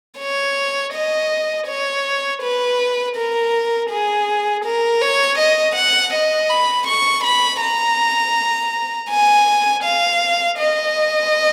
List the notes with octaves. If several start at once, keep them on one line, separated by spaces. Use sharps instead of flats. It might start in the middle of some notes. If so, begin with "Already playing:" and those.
C#5
D#5
C#5
B4
A#4
G#4
A#4
C#5
D#5
F#5
D#5
B5
C#6
B5
A#5
G#5
F5
D#5